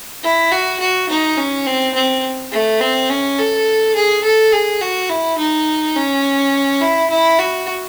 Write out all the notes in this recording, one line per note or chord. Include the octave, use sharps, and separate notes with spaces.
E4
F#4
F#4
D#4
C#4
C4
C4
A3
C4
C#4
A4
G#4
A4
G#4
F#4
E4
D#4
C#4
E4
E4
F#4